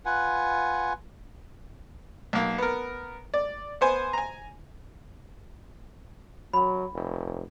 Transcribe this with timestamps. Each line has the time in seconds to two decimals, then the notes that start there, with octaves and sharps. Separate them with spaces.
0.06 F4 B4 F#5 G#5
2.33 B1 A#3
2.58 B3 A#4
3.34 D5
3.81 B3 C5 G#5
4.13 G#5 A#5
6.53 F#3 B5
6.93 F1